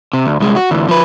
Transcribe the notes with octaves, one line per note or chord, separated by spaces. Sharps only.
C3
D2
C2 G#3
F#4
D2 E3
F3 B4